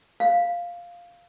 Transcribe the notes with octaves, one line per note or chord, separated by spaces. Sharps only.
F5